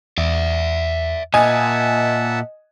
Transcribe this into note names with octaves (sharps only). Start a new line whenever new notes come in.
E2 D5 E5
A#2 D#5 E5 F#5 G#5 A5